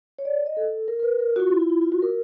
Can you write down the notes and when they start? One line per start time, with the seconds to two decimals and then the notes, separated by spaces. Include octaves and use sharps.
0.19 C#5
0.25 D5
0.46 D#5
0.57 A4
0.88 A#4
0.99 A#4
1.03 B4
1.19 A#4
1.36 F#4
1.40 F4
1.50 E4
1.60 F4
1.70 E4
1.82 F4
1.92 F#4
2.02 A#4